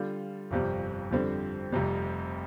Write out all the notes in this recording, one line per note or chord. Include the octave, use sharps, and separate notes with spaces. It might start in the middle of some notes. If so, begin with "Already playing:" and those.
Already playing: D3 G3 F4
G1 F2 C3 G3
F2 D3 G3 C4
F1 F2 C3 G3